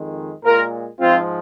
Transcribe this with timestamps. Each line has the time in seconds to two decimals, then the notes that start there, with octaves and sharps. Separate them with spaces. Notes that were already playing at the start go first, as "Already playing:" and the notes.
Already playing: F2 D#3 G#3
0.44 A#2 G#3 F4 A#4
1.00 G#2 F3 G#3 C4 F4